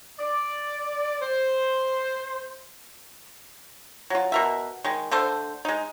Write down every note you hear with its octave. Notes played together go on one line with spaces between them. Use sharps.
D5
C5
F#3 F4
B2 A#4 E5
D#3 G#3
D3 A3 A4 C5
G#3 D#4